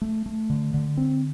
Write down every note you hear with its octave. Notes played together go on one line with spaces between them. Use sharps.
A3
A3
D3
D3
C4